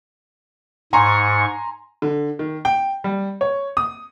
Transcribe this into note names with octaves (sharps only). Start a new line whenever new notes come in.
G#2 G#5 A#5 C6 C#6
D3
D#3
G5
G3
C#5
D#6